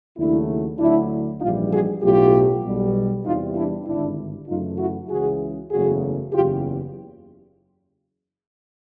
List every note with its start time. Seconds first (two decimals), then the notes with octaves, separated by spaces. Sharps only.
0.17 D#2 C#3 F#3 A3 D4 E4
0.78 D2 D3 F#3 D4 E4
1.40 A#1 G#2 E3 G3 D#4 F4
1.71 F#4 G#4
2.01 B1 A2 F#3 A3 F4 G4
2.64 B1 B2 G3
3.24 E2 C3 E3 G3 D#4 F4
3.56 D4 E4
3.86 G#1 G2 D3 D4 E4
4.47 F#2 C#3 E3 A3 D#4 F4
4.78 E4 F#4
5.09 C#2 C#3 E3 F#4 G#4
5.71 F#1 E2 C#3 F#3 A3 F#4 G#4
6.32 F#1 E2 C#3 F4 G4